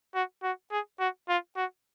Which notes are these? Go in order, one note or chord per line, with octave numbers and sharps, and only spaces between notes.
F#4
F#4
G#4
F#4
F4
F#4